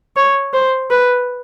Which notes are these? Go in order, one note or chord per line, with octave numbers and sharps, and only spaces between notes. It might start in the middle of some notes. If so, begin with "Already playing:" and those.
C#5
C5
B4